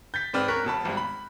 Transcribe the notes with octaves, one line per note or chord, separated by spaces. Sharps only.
G6 A6 B6
G#2 C4 B4 D5 F6
C#4 A#4 C#6 F#6 B6
E1 B2 A5 B5
G#1 G2
B5